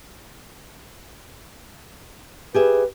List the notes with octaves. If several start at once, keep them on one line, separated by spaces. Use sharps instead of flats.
G4 G#4 B4 E5